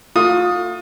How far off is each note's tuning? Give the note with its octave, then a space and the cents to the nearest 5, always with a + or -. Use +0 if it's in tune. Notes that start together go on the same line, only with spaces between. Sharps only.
A3 +35 F4 +35 D#6 +0